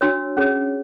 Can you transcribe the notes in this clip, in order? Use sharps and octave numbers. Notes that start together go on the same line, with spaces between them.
D4 F#4 C#5 E6
C#4 G#4 C#5